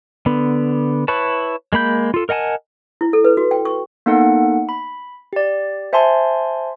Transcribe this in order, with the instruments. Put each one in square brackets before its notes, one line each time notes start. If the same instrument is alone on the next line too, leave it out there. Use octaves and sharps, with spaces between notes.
[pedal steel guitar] D3 B3
E4 B4 C#5 A5
G#3 A#3 B5 G6
F4 A4
A#4 D#5 F#5 G#5 A5
[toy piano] E4
A4
B4
F#4
G5
C#6
[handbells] A#3 B3 D#4 A4 F#5
B5
G4 D5
C5 E5 G#5 A5 C6